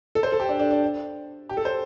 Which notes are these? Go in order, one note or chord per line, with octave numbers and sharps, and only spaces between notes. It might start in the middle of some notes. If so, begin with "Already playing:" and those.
A4
C5
A4
G4
D4
D4
D4
G4
A4
C5